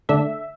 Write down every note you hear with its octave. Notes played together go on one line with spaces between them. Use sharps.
D3 A3 D4 E5